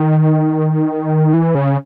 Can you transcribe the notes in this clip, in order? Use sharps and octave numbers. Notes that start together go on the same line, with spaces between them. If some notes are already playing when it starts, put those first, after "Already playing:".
Already playing: D#3
E3
C#3